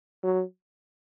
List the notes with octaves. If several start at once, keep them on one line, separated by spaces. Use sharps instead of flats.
F#3